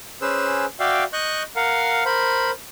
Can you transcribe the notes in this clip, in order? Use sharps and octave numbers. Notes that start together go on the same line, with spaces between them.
C#4 G#4 B4 C5 E6
F#4 D5 E5 F5 G5
D#5 C#6 F#6 G6
A#4 F5 F#5
A#4 C5 B5